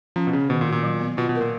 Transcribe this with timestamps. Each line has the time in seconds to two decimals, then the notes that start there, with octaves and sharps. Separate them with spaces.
0.16 F3 C#4
0.27 B2
0.33 C#3 C#4
0.49 B2 D#3
0.61 A#2
0.67 F#4
0.72 A#2
0.83 F#3
1.00 B3
1.17 B2 F4
1.29 B2
1.35 A#4
1.41 A#2